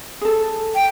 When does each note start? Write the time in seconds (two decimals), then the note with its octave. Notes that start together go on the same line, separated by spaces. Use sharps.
0.21 G#4 A4
0.75 G5